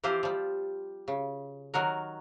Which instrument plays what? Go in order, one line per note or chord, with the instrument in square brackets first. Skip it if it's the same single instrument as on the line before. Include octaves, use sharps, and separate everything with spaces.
[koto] E3 F3 C4 F4 G4 C5
F3 G3
C#3
D#3 F#3 F#4 A#4